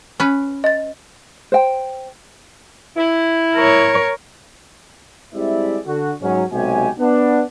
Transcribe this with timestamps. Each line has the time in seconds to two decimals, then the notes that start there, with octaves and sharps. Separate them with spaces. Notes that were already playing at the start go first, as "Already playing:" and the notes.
0.20 C#4 B4
0.64 D#5 A6
1.52 C5 G5
2.97 E4
3.55 A#4 C#5
5.34 G3 G#3 C4 E4 D5 E5
5.86 D3 F#4
6.22 G#2 F#3 C#4
6.52 B1 C3 G#3 F#4 G4 G#5
6.99 B3 D4